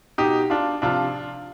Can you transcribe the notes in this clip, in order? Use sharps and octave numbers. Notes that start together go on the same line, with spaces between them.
B2 D#4 G4
D4 F4
C3 F3 D4 F4